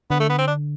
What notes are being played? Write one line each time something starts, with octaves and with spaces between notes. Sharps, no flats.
D3 B3
A3
B3
C4
D4